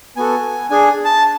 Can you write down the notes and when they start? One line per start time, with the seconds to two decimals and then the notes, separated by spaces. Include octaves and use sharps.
0.16 B3 F#4 A4 G#5
0.70 D4 G#4 G#5
1.05 A5